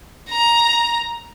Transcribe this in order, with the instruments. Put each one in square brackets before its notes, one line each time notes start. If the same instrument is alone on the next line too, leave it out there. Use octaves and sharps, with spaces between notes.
[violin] A#5